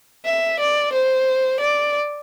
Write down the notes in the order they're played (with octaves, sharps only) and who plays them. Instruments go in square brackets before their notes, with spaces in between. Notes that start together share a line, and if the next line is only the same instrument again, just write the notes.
[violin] E5
D5
C5
D5